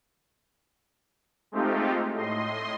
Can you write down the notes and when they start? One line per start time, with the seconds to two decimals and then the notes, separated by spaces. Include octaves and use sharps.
1.52 G#3 A3 C4 D#4 F4 G4
2.13 A2 D#5 C6